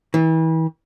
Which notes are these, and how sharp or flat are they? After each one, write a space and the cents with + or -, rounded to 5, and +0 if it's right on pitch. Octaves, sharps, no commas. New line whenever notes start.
E3 -35